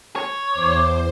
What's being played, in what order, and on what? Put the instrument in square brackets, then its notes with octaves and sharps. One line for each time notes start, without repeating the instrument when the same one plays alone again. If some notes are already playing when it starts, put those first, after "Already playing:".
[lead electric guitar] C#5
[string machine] E2 C5 [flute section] D6